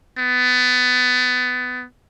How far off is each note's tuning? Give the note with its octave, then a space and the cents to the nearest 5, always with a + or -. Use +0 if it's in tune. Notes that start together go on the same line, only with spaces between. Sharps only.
B3 +20